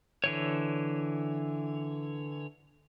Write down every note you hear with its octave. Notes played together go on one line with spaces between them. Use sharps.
D3 E3 C#5